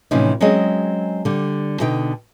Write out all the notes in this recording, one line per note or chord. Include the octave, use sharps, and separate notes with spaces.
A2 C3 E3 F3 C#4 D#4
F#3 G#3 C4 C#4 G#4 D#5
D3 G3
B2 D3 D#4 G5